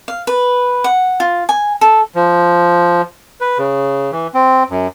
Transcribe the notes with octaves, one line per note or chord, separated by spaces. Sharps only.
F5
B4
F#5
F4
G#5
A4
F3
B4
C#3
E3
C4
F#2